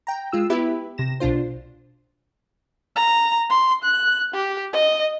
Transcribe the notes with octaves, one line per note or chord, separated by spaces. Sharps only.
G5 A#5
G#3 F4 E6
B3 E4 G4 B4 E5
C3 A#6 E7
B1 B2 D4 F4 C5
A#5
C6
F#6
G4
D#5